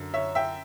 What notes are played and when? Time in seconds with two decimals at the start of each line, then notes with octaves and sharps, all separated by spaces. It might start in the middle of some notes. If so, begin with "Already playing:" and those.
Already playing: F#2 D3
0.14 C#5 E5
0.35 E5 G5